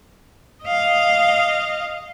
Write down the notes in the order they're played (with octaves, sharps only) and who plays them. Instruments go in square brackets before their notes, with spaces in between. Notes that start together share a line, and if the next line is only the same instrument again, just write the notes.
[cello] D#5 F5